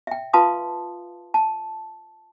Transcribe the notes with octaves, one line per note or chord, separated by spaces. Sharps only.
E5 G5
F4 B4 F5 A5 C6 D#6
A5